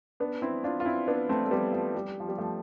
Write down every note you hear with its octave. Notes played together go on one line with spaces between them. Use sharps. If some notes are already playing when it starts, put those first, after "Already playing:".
B3 D4
C4 E4
D4 F4
F4
C4 E4
B3 D4
A3 C4
A3
G3 B3
F3
G3
F3
G3
F3 A3